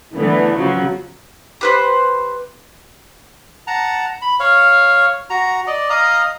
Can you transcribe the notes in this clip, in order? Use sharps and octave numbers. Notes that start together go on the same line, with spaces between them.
D3 E3 A3 B3
C#3 F3 F#3
G4 B4 C5
F#5 A5 A#5
B5
C#5 F5
F#4 A#5
D5 D#5
D#5 F5 A#5 D#6